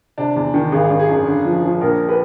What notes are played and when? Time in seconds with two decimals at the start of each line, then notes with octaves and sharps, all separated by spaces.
0.18 C3 D4
0.36 E2
0.54 D#3
0.72 G#1 G#4
0.90 G#1
0.99 G#4
1.08 F#2
1.26 D3
1.45 F3
1.63 F3
1.81 A#1 A#4
2.09 B4